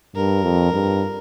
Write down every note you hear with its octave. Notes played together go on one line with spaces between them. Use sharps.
G2 A#4
F2
G2